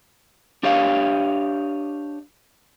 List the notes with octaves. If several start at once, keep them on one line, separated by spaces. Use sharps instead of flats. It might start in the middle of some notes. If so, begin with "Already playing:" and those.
D4 G4 C#5 D#5 F5